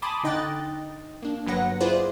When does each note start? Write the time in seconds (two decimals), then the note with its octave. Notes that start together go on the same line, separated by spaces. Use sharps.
0.02 G#5 A5 B5 C6 D6 D#6
0.24 D3 D#4 D#5 G5 F#6 A6
1.22 A#3 D4
1.46 G1 F#3 B4 F#5 A#6
1.80 E4 F4 G#4 B4 C5 D5